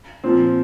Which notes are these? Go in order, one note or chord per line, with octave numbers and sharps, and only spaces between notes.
A#2 F3 C4